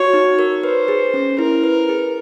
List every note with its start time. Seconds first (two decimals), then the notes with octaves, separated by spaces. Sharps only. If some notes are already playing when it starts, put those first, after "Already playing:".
Already playing: F#4 C#5
0.13 D#4
0.39 A#4
0.63 B4 C5
0.88 G#4
1.14 C#4
1.39 E4 A#4
1.64 B4
1.89 G#4